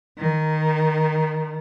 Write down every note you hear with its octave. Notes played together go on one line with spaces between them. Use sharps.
D#3